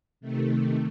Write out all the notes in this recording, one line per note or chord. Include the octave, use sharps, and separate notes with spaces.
C3 D#3 A3